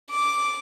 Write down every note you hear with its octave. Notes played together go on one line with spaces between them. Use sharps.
D6